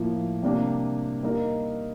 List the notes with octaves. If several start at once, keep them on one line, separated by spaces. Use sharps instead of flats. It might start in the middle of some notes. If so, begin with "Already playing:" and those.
Already playing: A2 F3 A#3
C3 G3 A#3 D4 G4
G3 A#3 D#4 A#4